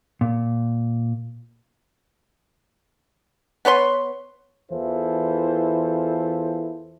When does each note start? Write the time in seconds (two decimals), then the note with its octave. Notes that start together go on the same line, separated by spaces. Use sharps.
0.21 A#2
3.65 B3 B4 C#5 C6
4.72 E2 E3 E4 F4 A4 C5